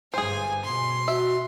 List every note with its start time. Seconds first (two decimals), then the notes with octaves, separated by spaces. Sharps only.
0.14 G1 G2 G#4 C5 G#5
0.65 B2 C6
1.08 F#4 E5